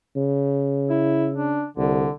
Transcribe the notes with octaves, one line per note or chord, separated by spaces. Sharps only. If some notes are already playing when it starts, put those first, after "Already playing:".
C#3
E4
D4
C2 D3